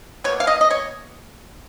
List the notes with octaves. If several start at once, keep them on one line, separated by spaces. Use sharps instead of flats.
B2 A#3 C#5
F5
D#5
D#5
C#5